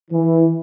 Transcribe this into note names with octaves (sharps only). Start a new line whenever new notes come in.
E3